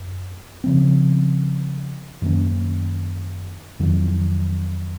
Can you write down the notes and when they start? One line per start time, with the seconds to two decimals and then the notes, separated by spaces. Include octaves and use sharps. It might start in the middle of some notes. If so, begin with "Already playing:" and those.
Already playing: F#2
0.64 C#3 F3 C4
2.22 F#2 D#3 A#3 C#4
3.79 F2 D#3 F#3